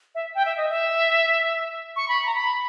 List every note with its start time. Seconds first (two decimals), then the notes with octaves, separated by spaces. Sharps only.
0.15 E5
0.35 G5
0.45 E5
0.57 D#5
0.69 E5
1.96 C#6
2.08 B5
2.26 A#5
2.35 B5